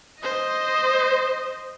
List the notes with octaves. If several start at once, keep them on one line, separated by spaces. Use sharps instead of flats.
C5 D#5